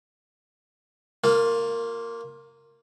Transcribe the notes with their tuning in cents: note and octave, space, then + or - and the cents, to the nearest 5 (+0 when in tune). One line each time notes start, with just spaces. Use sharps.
A#3 -15 F4 +20